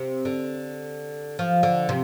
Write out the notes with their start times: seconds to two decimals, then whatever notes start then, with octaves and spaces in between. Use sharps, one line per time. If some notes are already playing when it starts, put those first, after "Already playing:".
Already playing: C3
0.25 D3
1.39 F3
1.63 D3
1.89 C3